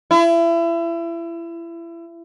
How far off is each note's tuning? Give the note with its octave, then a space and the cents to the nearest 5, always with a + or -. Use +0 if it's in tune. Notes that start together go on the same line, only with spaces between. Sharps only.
E4 +30